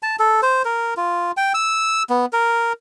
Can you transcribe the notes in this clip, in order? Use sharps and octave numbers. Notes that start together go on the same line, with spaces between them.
A5
A4
C5
A#4
F4
G5
E6
B3
A#4